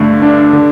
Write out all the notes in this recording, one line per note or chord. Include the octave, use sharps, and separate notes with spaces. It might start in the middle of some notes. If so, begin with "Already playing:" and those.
Already playing: G2 D3 A3
D4
D3